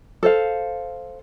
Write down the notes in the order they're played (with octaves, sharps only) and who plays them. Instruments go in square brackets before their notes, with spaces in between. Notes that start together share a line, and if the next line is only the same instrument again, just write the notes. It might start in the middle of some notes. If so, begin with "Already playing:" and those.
[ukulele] A4 C5 F5